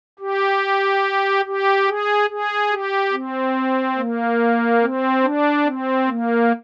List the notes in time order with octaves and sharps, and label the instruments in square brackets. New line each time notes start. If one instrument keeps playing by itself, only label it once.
[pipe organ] G4
G4
G#4
G#4
G4
C4
A#3
C4
D4
C4
A#3